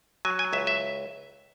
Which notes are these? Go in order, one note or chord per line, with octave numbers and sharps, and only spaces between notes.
F#3 G#5
G#5
C#2 E5
E5